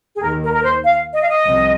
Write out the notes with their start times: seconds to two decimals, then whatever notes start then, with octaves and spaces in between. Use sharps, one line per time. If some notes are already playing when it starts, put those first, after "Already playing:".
0.14 G#4
0.21 D#2 D#3 A#3 A#4
0.42 A#4
0.53 A#4
0.63 C5
0.84 F5
1.14 D#5
1.21 F5
1.29 D#5
1.45 C2 C3 F3